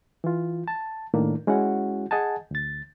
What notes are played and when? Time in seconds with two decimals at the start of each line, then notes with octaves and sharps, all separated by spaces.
0.24 E3 F4
0.68 A5
1.14 A2 D#3 A#3 D4
1.47 G#3 C#4 E4 F#4 F#5
2.11 G#4 D#5 F#5 G#5 A5
2.51 D2 A6